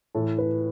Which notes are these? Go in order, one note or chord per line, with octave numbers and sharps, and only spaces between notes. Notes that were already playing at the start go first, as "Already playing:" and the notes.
A2 E3 A4
B4